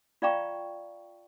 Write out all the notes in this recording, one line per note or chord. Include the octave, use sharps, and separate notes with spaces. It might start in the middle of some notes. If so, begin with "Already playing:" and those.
F4 D5 F5 G5 A#5 C#6